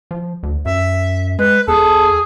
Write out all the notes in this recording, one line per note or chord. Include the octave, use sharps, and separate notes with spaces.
F3
D2
F#2 E5
G#3 B4
E2 G#4 A4